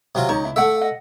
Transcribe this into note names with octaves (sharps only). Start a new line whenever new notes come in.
C3 F#3 F4
C#2 D#4 C#5 A#5 C#6
E4 E5
A3 A4 E5 F#5
D#5 F#5